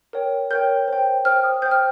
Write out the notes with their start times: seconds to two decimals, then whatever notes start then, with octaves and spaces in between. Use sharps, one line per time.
0.13 A#4 C#5 G5
0.51 A#4 C#5 G5 G6
0.88 C5 G5
1.25 C5 G5 F6
1.44 D#6
1.62 C5 G6
1.66 G5
1.71 F6